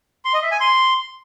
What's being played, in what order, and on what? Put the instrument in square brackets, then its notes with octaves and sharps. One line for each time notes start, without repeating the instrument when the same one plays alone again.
[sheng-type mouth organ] C6
D#5
E5
G#5
C6